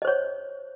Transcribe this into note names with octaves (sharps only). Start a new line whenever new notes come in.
C5 C#5 D#5